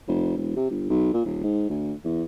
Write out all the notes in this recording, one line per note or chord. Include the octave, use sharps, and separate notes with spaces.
F1
E1
C3
G1
B1
A#2
D#1
G#2
D2
E2